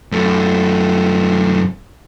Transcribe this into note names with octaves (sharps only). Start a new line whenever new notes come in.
F#2 A3